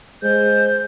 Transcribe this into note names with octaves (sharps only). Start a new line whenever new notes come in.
G#3 C5 G6